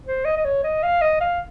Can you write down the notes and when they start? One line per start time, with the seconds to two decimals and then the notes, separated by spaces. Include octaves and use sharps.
0.07 C5
0.25 D#5
0.37 D#5
0.45 C#5
0.64 D#5
0.83 F5
1.01 D#5
1.21 F5